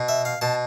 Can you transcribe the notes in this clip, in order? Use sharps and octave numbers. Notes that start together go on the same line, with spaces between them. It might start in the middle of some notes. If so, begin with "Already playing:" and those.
Already playing: B2
E5
F5
B2 A5